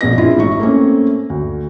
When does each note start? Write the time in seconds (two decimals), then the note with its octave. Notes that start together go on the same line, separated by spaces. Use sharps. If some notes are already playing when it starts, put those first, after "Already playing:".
0.01 A#1 B2 B3 G#4 D#5 A#6
0.18 C4 D4 E4 F4
0.37 A1 G#2 E5 C#6
0.60 A3 A#3 C4 C#4
1.30 D2